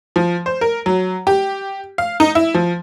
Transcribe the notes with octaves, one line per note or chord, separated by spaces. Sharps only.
F3
C5
A#4
F#3
G4
F5
D#4
E4
F3